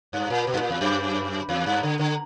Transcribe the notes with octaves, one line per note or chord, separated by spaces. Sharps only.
G2
A#2
B2
G2
A#2
E2
F#2
E2
G2
D3
D3